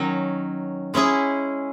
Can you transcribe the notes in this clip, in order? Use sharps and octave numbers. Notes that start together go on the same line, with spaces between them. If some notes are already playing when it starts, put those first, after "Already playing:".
Already playing: D#3 F#3 C#4
G#3 C#4 E4 G#4